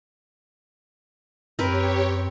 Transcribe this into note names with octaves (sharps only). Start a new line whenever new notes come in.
F#2 C4 G4 A#4 B4 C#5